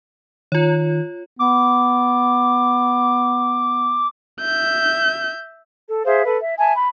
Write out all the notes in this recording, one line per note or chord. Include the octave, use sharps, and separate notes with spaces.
D#3 F4 C#5
B3 D6
E5 G6
A4
G#4 C5 E5 F5
A4 B4
E5
E5 G#5 A5
B5